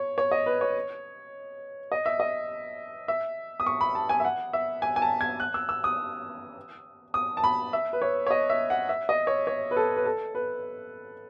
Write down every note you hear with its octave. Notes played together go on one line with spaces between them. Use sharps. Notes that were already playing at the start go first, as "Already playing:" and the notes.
Already playing: C#5
C#5
D#5
B4
C#5
D#5
E5
D#5
E5
D#6
C#6
B5
A5
G#5
E5
F#5
E5
G#5
G#5
A5
G#6
F#6
E6
E6
D#6
D#6
A5
B5
E5
B4
C#5
C#5
D#5
E5
F#5
E5
D#5
C#5
C#5
B4
A4
B4
A4
B4